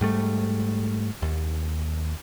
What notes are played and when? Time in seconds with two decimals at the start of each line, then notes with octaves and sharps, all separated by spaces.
0.01 G#2 G3 A3
1.22 D#2